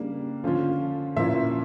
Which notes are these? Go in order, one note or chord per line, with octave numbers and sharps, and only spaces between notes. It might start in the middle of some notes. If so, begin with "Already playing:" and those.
Already playing: C#3 G3 A#3 D4
D3 F3 C#4 F4
A#2 F3 A#3 C#4 E4 E5